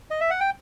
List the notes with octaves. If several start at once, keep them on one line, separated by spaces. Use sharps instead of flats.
D#5
E5
F#5
G5